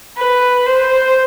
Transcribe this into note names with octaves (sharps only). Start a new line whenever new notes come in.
B4
C5